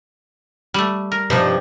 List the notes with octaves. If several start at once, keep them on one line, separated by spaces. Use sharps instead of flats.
G3 A3
A#4
G2 C3 F3 D#4